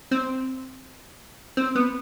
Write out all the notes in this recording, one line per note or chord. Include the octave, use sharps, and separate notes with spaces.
C4
C4
B3